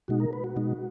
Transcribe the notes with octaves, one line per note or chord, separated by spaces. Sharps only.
B2 G#3 D#4 F#4
A#4
B4
F#4
B2 G#3 D#4